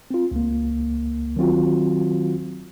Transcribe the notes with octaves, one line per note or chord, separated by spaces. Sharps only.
C4 F4
C#2 A#3
D#3 F#3 C4 F4 F#4